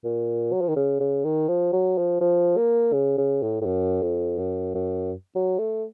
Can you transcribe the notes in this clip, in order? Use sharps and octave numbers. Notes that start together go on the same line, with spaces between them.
A#2
F#3
F3
D#3
C#3
C#3
D#3
F3
F#3
F3
F3
A#3
C#3
C#3
A2
A2
F#2
F2
F#2
F#2
F#3
A3